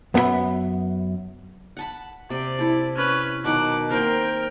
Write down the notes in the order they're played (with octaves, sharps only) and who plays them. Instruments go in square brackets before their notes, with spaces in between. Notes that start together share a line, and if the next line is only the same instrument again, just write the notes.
[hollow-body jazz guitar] F#2 B3 D4 A#4 E5 B5
[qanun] F#5 A5 B5
[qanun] C3 G5 [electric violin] D5
[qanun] E4 A4
[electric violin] C#4 B4
[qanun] B2 D#3 F#3 [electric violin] F#5 D6
[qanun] A#3 C4 C5 [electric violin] A#4 G5